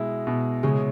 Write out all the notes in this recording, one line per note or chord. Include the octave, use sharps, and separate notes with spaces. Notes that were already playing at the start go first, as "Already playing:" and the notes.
Already playing: B2 G#3 E4
B2
C#3 G#3 C#4